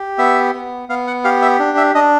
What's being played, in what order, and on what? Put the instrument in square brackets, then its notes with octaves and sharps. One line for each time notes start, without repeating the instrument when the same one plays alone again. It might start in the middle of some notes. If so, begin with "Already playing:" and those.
Already playing: [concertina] G4
B3 E5
B3
B3 F5
F#5
G4 F5
E5
D4
E5
D4 D#5